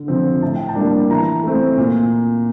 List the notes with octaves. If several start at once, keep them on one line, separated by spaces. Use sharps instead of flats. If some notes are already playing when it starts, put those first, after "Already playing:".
Already playing: D3
F3 C4
A2 A5
G5
A5
G3 A#3 D4
E3 A#5
A3 C4
A#2